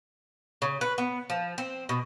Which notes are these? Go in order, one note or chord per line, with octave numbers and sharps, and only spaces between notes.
C#3
B4
B3
F3
C4
B2